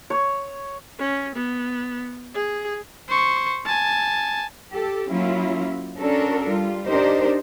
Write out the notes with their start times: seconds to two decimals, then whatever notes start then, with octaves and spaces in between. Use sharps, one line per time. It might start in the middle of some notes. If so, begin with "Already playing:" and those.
0.10 C#5
0.98 C#4
1.36 B3
2.34 G#4
3.09 C5 C#6
3.66 G#5 A5
4.71 G4 A4
5.08 F#3 A#3 C#4 E4 F4
5.98 C#4 D4 F#4 A4 A#4
6.49 G3 F4
6.85 D4 D#4 G4 A#4 C5